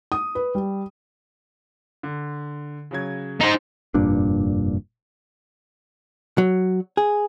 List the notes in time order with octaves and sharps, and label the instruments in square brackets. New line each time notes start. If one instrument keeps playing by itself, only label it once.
[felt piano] D#6
B4
G3
[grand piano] D3
C#3 F#3 G#6
[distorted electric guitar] D#4 C5
[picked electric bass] F1 G2 A#2 D4
[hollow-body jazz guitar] F#3
G#4